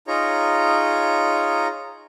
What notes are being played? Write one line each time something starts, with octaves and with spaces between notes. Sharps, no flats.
D#4 F4 G#4 C#5 A#5